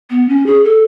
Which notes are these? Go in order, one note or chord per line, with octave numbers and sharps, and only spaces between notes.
B3
C#4
G#4
A4